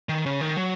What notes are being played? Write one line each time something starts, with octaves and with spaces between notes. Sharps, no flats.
D#3
C#3
D#3
F#3